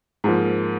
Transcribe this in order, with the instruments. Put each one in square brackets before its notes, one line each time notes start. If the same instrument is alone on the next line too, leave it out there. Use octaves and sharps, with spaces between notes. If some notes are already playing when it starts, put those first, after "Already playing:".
[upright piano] G#2 F3 A#3